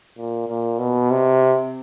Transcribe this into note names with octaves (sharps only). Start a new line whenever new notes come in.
A#2
A#2
B2
C3